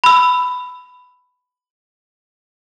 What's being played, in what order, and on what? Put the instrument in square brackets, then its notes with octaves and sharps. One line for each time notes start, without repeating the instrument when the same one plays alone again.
[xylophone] B5 E6